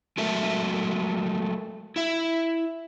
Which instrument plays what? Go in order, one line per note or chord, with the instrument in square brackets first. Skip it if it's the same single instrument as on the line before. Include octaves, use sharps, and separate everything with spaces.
[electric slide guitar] F#3 G#3 A3 A4 A#4 E5
E4 E5